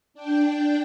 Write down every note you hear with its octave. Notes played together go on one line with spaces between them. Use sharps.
D4 G5